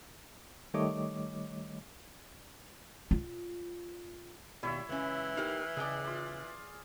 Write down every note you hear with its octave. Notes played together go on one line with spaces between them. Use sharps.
D#3 G3 A3 C#5 D#5 D6
F4
D#2 B2 G3 E4 C#5 E5
C#2 E3 C#4
D#4 G4 A#4 F5
C#3 G#4 D5 D#5 G5
F4 D5